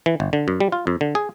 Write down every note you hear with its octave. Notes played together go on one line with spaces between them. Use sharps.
E3
G1
D3
F#2
G3
F4
F2
D3
G#4